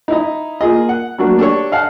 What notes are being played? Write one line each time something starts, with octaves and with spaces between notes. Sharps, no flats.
D#4 E4 D#5
A#3 F4 G#4 D#5
F#5
F#3 A3 A#3 D4 F#4
D4 G4 A4 C#5
D#5 F5 F#5 A5